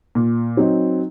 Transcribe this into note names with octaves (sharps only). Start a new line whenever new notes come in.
A#2
F#3 C4 D#4